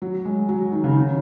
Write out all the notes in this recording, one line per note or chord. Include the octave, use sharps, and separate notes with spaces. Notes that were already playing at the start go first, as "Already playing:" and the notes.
F#3
G#3
F#3
D#3
C#3
D#3